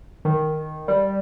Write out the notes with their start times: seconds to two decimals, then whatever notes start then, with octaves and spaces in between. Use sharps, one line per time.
0.25 D#3
0.88 G3